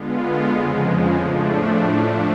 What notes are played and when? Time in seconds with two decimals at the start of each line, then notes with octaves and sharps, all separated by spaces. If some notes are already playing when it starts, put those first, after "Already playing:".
Already playing: D3 G#3 B3 F4
0.54 F2 C#3 F3 G#3
1.20 A2 F3 A3 D4